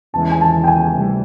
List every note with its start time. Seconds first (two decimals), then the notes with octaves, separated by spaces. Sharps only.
0.13 E2 C#3 E3 G#3 A5
0.31 G#5
0.41 A5
0.64 G5
0.67 G#5
0.94 D2 C3 E3 G3